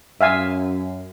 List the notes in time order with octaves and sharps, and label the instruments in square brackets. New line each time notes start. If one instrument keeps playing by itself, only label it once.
[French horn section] F#2 [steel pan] E5 F5 G#5